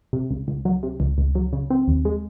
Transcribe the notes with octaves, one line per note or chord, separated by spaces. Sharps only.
C3
C#2
C#2
F#3
C3
C#2
C#2
F#3
C#3
C4
D#2
G#3